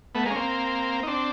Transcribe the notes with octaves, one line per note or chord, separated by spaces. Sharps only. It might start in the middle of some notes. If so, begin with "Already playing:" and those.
A3 B3
G#3 A#3
C#4
A#3 C4
D#4
C4 D4